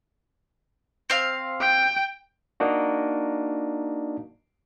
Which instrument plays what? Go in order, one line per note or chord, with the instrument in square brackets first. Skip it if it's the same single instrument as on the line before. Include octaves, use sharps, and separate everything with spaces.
[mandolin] C4 F5
[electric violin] G5
[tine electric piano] A#3 D4 D#4 F#4